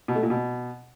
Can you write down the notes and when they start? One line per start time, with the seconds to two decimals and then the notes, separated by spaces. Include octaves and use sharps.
0.08 B2
0.16 A3
0.23 A#2
0.30 B2